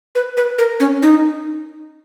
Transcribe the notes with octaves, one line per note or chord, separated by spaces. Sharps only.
B4
B4
A#4
C#4
D#4